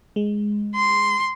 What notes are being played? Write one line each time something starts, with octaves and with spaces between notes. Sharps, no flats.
G#3
C6